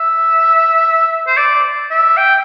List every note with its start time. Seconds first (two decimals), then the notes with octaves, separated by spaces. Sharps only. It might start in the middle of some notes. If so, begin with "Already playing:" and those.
Already playing: E5
1.27 C5
1.37 D5
1.91 E5
2.17 G5